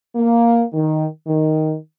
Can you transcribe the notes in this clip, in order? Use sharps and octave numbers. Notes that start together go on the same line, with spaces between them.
A#3
D#3
D#3